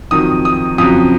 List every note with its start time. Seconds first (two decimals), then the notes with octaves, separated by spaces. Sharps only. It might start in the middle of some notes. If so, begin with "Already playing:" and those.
0.11 F2 D#3 F#3 D#6
0.45 D#6
0.78 F2 C#3 F#3 D#6